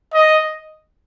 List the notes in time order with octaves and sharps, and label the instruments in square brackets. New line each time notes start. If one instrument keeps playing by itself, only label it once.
[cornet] D#5